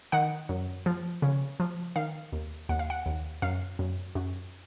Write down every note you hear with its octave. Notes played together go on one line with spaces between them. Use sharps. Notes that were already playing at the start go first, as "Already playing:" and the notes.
D#3 F#5
F#2
F3
C#3
F3
D#3 F5
D#2
D#2 F#5
F5
F#5
D#2
F#2 F5
F#2
F#2